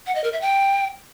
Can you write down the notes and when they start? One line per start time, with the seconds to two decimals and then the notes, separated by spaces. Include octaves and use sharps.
0.07 F#5
0.15 D#5
0.24 A#4
0.33 E5
0.41 G5